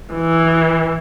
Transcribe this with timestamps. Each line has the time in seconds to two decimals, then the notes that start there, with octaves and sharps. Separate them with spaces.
0.13 E3